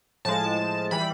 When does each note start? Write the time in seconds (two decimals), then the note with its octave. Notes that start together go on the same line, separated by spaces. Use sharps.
0.25 A2 F3 G#3 A5
0.91 E3 G3 B5